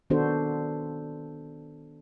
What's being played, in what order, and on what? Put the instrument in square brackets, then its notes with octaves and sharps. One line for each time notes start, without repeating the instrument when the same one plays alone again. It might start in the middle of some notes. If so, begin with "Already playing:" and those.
[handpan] D#3 B3 D4 F#4 A4 C5